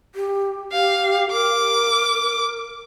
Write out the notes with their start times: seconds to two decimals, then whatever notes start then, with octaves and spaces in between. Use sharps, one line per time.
0.15 G4
0.72 G4 F5
1.31 A#4 D6